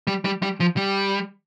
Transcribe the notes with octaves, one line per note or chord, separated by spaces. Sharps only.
G3
G3
G3
F3
G3